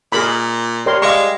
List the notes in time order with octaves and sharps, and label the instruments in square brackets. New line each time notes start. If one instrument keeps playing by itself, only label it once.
[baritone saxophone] A#2 [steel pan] G#4 A#4 B5
[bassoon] G3 [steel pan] A#4 C#5 C6
[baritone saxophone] G#3 [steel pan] F5 C#6